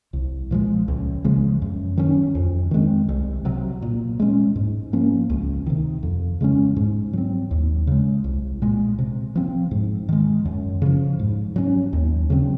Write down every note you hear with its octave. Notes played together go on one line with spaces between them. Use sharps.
C2
A#2 F3 G#3
C#2
C#3 F3 G#3
F#2
D#3 F#3 C#4
F2
D#3 G#3 C4
C2
C3 F#3
A#2
G#3 C#4
G#2
F3 A#3 C#4
C#2
C3 D#3
F2
C#3 G#3 C#4
G#2
F#3 C4
D#2
C#3 G#3
C2
A#2 G#3
C3
F3 C4
G#2
D#3 G#3
F#2
C#3 F3
G#2
F#3 C#4
D#2
C#3 F#3 C4